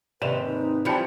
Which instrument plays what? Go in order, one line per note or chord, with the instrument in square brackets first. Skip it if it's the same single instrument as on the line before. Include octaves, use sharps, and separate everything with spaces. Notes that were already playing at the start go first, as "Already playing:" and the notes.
[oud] D#2 G#2 C3 [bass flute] B4 [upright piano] D5 E7 F7
[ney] D#4
[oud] E3 F3 G3 [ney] G5 [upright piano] A5 C#7 F7